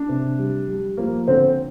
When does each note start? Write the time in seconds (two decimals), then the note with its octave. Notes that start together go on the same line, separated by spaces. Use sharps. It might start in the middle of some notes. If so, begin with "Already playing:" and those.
Already playing: D4
0.09 C3
0.39 G3
0.69 G3
0.97 F3 A#3
1.28 D3 C4